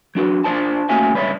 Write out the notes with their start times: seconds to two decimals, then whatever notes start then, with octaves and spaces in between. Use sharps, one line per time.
0.15 F#3 D4 F#4 B4
0.44 D4 F4 C5 D5 A5
0.89 A3 A#3 C#4 F#4 E5 G#5
1.14 C#2 G2 B4 C#5 D5 E5